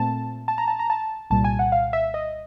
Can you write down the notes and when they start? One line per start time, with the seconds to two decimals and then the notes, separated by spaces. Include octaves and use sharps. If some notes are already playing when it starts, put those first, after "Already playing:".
Already playing: A#2 A3 C4 A5
0.48 A5
0.58 A#5
0.68 A5
0.79 A#5
0.90 A5
1.30 C2 A#2 G3 A5
1.44 G#5
1.59 F#5
1.72 F5
1.93 E5
2.14 D#5